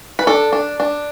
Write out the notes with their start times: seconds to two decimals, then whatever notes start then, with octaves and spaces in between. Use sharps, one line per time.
0.19 B4
0.27 D4 A4
0.53 D4
0.80 D4